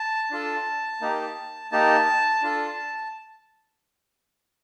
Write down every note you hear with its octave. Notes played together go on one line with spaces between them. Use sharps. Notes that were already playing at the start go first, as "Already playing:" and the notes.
Already playing: A5
D4 F4 A4
A#3 D#4 G4
A#3 D#4 G4 A5
D4 F4 A4